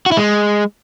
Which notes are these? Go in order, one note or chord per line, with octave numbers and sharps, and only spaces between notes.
F#4
E4
G#3